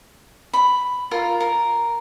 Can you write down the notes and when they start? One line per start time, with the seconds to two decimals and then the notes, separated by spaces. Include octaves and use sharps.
0.53 B5
1.11 F4 A#4
1.40 A#4